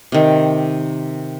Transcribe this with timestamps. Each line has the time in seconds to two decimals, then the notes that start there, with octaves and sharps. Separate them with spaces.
0.12 C3 D#3